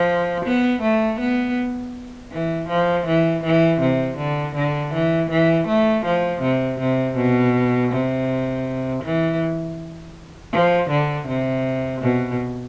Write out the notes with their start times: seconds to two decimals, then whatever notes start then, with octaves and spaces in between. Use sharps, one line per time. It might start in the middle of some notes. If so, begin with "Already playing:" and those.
Already playing: F3
0.45 B3
0.82 A3
1.19 B3
2.32 E3
2.69 F3
3.06 E3
3.44 E3
3.81 C3
4.17 D3
4.55 D3
4.93 E3
5.30 E3
5.67 A3
6.05 F3
6.41 C3
6.80 C3
7.17 B2
7.92 C3
9.04 E3
10.52 F3
10.90 D3
11.27 C3
12.01 B2